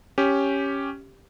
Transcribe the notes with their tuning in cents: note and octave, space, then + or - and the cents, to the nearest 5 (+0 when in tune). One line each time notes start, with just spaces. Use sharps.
C#4 +0 G4 +0